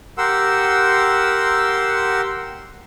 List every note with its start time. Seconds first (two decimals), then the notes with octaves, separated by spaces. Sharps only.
0.18 G4 A#4 F#5 C6 E6